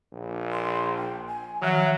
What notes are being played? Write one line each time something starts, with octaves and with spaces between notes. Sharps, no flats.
A#1
C6
G5
G#5
D#3 F3 F#3 E5 F#6